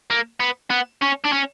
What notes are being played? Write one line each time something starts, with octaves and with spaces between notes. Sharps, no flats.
A#3
B3
B3
C#4
D4
C#4